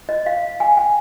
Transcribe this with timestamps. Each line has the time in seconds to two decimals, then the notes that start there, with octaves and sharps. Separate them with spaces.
0.09 D#5
0.26 F5
0.60 G#5
0.77 G5